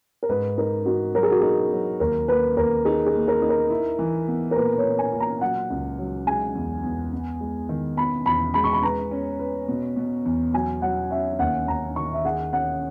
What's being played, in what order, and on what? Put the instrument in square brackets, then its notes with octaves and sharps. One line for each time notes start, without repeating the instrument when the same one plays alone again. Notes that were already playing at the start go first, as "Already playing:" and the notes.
[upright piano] A#4
[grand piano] G#2 [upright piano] B4
[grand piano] D#4 [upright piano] A#4
[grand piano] D#4 [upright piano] F#4
[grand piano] F#3 [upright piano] A#4
[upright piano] G#4
F#4
[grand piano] D#4 [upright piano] G#4
[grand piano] F#3
[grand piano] D#2 [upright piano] A#4
[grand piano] A#3 [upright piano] B4
[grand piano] D#2 [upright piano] A#4
[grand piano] D#4 [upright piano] G#4
[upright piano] G#4
[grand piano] A#3
[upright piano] A#4
[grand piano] D#4
[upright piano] A#4
[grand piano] E4
E3
B3
[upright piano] A#4
[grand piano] A#2 [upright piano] B4
[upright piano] C#5
[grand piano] A#2
[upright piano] G#5
[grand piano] A#2
[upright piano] A#5
[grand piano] F#3 [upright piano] F#5
[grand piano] C#2
F#3
[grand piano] G#3 [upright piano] G#5
[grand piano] E2
E2
B3
G#3
D#3
[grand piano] B3 [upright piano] B5
[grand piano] E2 [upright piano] B5
[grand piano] G#3 [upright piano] B5
[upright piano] C#6
B5
[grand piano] B4 [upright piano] A#5
[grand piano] C#4
B4
B2
B2
E2
[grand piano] F#3 [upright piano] G#5
[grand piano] F#3 [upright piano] F#5
[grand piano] C#4 [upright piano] E5
[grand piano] D#2 [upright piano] F#5
[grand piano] D#2 [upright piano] A#5
[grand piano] D#3 [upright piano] C#6
[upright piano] E5
[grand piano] G#4 [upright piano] F#5
[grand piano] C#4 [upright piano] F#5